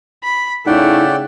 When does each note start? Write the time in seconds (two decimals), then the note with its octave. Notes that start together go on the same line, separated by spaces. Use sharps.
0.24 B5
0.66 C#3 A3 D#4 E4 D5 F#5 G5